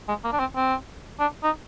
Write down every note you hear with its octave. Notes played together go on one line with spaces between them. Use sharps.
G#3
A#3
D4
C4
C4
D4
D#4